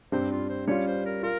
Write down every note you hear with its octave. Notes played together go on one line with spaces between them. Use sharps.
G2 G3 C4 C5
F4
C5
G3 C#4 F4 C#5
C5
A#4
F4 A#4